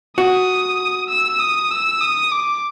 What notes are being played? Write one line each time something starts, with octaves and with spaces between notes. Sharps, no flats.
F#4 D#6
E6
D#6
E6
D#6
D6